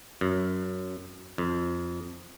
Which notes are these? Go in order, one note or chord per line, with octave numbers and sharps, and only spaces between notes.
F#2
F2